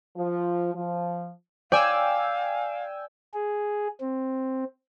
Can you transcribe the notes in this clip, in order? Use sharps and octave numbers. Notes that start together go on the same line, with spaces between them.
F3
F3
D5 F5 G5 G#5 E6
G#4
C4